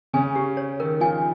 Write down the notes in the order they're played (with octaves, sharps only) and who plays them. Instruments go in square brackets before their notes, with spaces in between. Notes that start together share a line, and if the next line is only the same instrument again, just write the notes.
[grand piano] C#3 C#4 [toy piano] G#5
[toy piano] G4
C#5
[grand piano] D#3 D#4 [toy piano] A#4
[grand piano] F3 F4 [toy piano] G#5